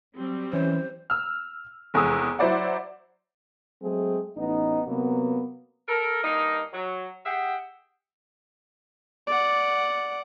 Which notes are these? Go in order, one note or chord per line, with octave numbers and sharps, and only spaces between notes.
F#3 G3 C4
E3 C#4 C5
E6 F6
F1 E2 G#3 D#6 E6
F#3 E4 C5 D5 F#5
F#3 G#3 A3 C4 G#4
A1 B3 D#4
C3 F#3 A#3 B3
A4 A#4
G2 A#3 D#4
F#3
G4 G#4 E5 F#5 G5
D5 F#5